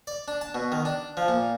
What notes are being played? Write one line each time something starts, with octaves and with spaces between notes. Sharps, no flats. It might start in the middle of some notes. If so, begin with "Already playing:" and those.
D5
D4
A5
B2
D#3
D4
F3
A#2